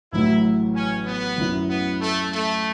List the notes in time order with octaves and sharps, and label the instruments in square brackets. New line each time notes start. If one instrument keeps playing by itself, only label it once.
[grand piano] A1 A2 F#3 [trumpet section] E4
[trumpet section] C#4
B3
[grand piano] F#2 F#3 C#4 E4
[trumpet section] B3
A3
A3